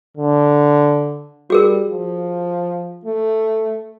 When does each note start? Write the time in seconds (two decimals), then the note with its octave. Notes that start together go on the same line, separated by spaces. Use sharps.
0.17 D3
1.50 G3 F#4 G#4 A#4
1.90 F3
3.05 A3